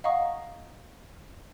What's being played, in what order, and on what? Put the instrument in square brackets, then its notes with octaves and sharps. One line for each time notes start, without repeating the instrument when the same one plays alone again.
[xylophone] D#5 F5 F#5 A#5 C#6 D#6